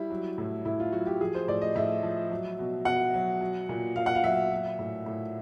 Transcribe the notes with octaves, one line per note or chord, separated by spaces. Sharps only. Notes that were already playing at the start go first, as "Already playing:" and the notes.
Already playing: G3 E4
F#3
A2
A2 E4
F4
F#3 F#4
G4
F3 G#4
C5
A2 D5
D#5
A2 E5
F3
F#3
B2
B2 F#5
F#3
F#3
A#2
A#2 F5
F#5
F5
F#3 E5
F#3
A2
A2